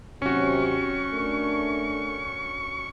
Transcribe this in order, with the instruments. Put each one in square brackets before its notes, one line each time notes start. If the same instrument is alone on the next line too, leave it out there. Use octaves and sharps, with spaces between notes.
[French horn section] D#2 C3 F#3 [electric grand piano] C#4 F#4 [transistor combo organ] C#6
[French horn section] A3 D4 A#4